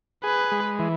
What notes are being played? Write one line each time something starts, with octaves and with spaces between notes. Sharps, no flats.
G#4 B4
G#3
E3